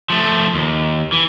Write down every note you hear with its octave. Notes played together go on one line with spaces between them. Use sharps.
F3 A3
D#2
E3